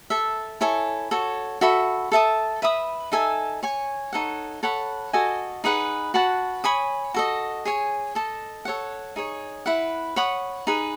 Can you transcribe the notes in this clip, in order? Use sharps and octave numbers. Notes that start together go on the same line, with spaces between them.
A4 E5 A5
E4 A4 C#5 G#5
F#4 A4 C#5
F#4 A4 E5 B5
A4 E5 A5 D#6
B4 E5 B5 D#6
D#4 A4 E5 G#5
C#5 G#5 C#6
D#4 A4 C#5 F#5
A4 C#5 F#5 B5
F#4 A4 D#5 G#5
D#4 G#4 B4 F#5
F#4 B4 F#5 A5
C#5 G#5 B5 D#6
F#4 A4 D#5
G#4 C#5 G#5
A4 D#5 A5
A4 C#5 F#5
D#4 G#4 C#5
E4 B4 F#5
C#5 F#5 B5 D#6
D#4 G#4 B4